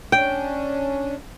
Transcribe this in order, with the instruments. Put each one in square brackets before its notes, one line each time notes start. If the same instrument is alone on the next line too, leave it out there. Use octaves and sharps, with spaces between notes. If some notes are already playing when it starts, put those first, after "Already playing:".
[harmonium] C#4 D4 [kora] G5